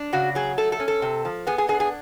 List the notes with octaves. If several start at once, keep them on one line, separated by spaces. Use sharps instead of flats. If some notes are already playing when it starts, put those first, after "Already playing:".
Already playing: D4
C#3 F#4
F#3 G#4
A3 A4
A4
C#4
A4
C3
F3
B3 G#4
G#4
D4 G#4
G#4